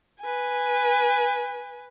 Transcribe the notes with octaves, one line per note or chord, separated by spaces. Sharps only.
B4 G#5